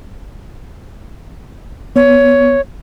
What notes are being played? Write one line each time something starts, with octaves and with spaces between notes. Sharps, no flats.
B3 C#5